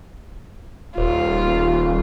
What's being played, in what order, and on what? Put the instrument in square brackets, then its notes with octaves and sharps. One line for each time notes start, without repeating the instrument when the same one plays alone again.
[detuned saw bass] D#1 [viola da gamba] F4